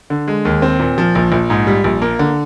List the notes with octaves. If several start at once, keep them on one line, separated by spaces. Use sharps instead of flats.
D3
G#3
D#2
C4
A#2
F3
A#1
A#1
G#2
G3
A#1
A#3
D3